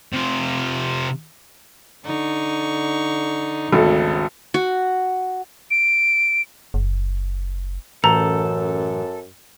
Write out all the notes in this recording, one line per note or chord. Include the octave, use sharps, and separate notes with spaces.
C3 F4
D3 D#4 C#6
G#1 D2 C#3 A4
F#4
D7
F#1
A1 F#2 A4 A#5